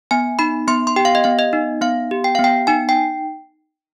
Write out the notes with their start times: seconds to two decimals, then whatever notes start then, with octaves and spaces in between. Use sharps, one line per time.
0.11 B3 G#5
0.39 D#4 B5
0.67 B3 C6
0.87 C6
0.96 G4 G5
1.05 F5
1.15 D#5
1.24 B3 F5
1.39 D#5
1.53 D#4
1.81 B3 F5
2.11 G4
2.24 G5
2.35 B3 F5
2.44 G5
2.67 D#4 G#5
2.89 G5